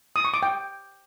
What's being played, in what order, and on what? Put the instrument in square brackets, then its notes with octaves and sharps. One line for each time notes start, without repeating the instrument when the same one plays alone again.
[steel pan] D#6
C#6
D6
G5